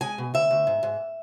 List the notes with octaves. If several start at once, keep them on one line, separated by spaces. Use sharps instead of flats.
G#3 G#5
B2
D2 E5
D2
G#2
G#2